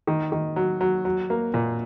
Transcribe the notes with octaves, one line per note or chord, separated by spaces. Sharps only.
D#3
D#3
F#3
F#3
F#3
A#3
A#2